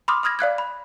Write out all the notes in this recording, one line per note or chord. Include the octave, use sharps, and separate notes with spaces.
B5 C6 D6 D#6 F6
B5 D#6 F6 G#6 A#6
D5 F5 F#6 G#6
B5